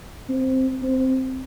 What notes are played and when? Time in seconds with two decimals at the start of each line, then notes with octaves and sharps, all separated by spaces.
0.29 C4
0.82 C4